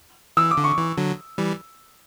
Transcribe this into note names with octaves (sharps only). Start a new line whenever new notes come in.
E3 E6
D6
D3
C#6
E3
D3 F#3
E3 G3